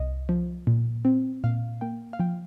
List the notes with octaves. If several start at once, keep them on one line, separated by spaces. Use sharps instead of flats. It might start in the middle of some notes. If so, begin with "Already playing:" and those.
Already playing: C2 D#5
F3
A#2
C4
A#2 F5
A#3 G5
F5
F3 G5